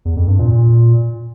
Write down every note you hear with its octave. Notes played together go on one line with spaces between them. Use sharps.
E2
F2
G2
A#2
A#2